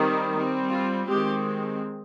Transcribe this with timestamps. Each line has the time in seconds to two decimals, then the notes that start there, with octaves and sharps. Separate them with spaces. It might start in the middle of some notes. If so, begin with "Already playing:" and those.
Already playing: D#3 G3 C4
0.36 G3 C4
0.72 F4
1.07 D#3 G#3 C4 G4